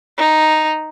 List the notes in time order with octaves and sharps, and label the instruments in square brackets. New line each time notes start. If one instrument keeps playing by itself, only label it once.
[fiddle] D#4